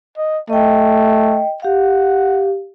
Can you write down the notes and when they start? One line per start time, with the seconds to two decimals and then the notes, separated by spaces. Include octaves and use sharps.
0.18 D#5
0.50 A3 D#5 G5
1.62 G4 F5 F#5